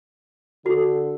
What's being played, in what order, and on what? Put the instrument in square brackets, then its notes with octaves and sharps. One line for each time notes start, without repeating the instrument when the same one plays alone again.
[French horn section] D3 A4 [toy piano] F#4